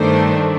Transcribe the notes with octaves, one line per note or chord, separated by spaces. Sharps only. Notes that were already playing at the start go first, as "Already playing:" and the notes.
Already playing: G2 D#3 A3 D4 C5